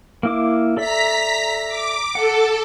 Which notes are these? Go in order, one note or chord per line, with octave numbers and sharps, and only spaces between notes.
A#3 E4 D6
A4 D5 E5 A#5 B6
D6
A4 F#5